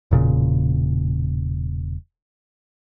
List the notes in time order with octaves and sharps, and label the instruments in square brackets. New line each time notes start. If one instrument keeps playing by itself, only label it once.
[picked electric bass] E1 A#2 C#3